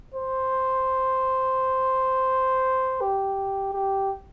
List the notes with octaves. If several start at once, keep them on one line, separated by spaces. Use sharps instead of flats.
C5
G4
G4